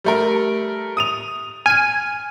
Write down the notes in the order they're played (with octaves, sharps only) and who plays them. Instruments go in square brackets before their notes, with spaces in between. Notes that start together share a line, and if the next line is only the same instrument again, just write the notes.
[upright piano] G3 A3 A#4
D#6 D#7 F7
[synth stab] G#5 [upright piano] F6 D#7